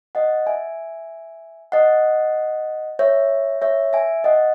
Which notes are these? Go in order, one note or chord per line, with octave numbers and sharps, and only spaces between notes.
D#5 F#5
E5 G#5
D#5 F#5
C#5 E5
C#5 E5
E5 G#5
D#5 F#5